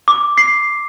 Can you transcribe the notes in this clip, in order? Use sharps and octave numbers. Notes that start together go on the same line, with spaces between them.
D6
C7